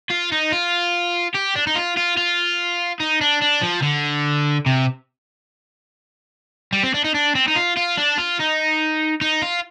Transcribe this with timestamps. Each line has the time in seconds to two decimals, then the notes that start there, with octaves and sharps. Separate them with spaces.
0.10 F4
0.32 D#4
0.52 F4
1.34 G4
1.56 D4
1.67 D#4
1.76 F4
1.97 F4
2.17 F4
3.00 D#4
3.21 D4
3.42 D4
3.62 F3
3.83 D3
4.66 C3
6.73 G3
6.83 C4
6.94 D4
7.04 D#4
7.14 D4
7.35 C4
7.48 D#4
7.56 F4
7.77 F4
7.97 D4
8.18 F4
8.39 D#4
9.21 D#4
9.42 F4